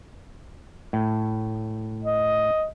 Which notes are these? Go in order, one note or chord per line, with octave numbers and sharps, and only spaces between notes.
A2
D#5